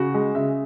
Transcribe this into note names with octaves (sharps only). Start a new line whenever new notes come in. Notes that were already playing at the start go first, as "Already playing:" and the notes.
Already playing: C#3 F#4
G#3
C#3 E5